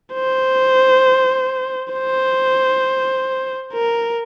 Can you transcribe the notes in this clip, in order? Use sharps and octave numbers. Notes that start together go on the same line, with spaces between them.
C5
C5
A#4